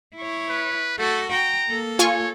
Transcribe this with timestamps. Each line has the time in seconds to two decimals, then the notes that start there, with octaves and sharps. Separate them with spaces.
0.16 E4 C#5
0.49 B4
0.98 A3 F#4 A4
1.32 G5 A#5
1.68 A#3 A4
1.99 F4 C#5 G#5 C#6